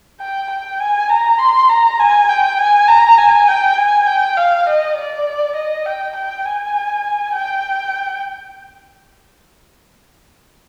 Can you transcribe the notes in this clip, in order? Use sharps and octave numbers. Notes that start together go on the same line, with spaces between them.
G5
G5
G#5
A#5
C6
A#5
G#5
G5
G#5
A#5
G#5
G5
G#5
G5
F5
D#5
D5
D#5
G5
G5
G#5
G5